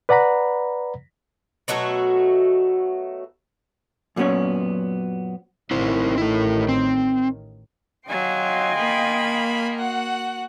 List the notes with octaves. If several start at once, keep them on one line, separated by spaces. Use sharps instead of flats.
B4 D5 F#5 A#5 B5
B2 F#3 A3 F#4
F#2 A#2 F#3 B3 C#4 C#5
A1 A2 D#3 C4 E4 C5
A3 E4
C4
F#3 D#5 F5 G5 G#5 C6
A#3 B5
F#4 F#5